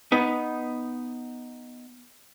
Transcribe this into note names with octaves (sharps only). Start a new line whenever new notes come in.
B3 D#4